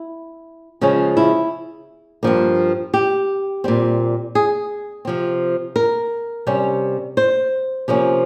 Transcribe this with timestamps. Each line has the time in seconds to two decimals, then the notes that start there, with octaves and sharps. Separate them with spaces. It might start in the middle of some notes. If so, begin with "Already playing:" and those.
Already playing: E4
0.81 C#3 F3 G#3 C#4
1.17 E4
2.23 G2 F3 A#3
2.94 G4
3.64 A#2 G3 C4
4.35 G#4
5.05 C3 F3 C4
5.76 A#4
6.47 C3 G3 C#4
7.17 C5
7.88 C3 F3 A#3 C#4